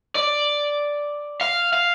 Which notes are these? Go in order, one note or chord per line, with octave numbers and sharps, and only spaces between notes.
D5
F5
F5